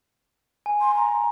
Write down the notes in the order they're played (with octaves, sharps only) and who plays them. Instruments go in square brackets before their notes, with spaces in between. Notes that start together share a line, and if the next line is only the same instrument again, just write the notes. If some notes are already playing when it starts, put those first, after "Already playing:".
[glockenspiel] G#5
[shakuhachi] C6
A#5